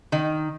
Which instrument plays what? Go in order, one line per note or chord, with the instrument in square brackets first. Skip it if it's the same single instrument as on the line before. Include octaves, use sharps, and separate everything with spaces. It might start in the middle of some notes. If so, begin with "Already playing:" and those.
[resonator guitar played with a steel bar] D#3